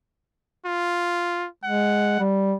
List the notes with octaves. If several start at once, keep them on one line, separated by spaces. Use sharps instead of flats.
F4
G#3 F#5
G3